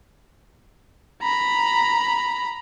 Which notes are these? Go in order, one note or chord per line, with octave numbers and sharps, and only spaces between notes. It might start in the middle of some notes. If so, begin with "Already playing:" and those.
A#5 B5